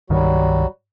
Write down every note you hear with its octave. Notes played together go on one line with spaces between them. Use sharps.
C2 G2 D#3 F#3 G3 F#4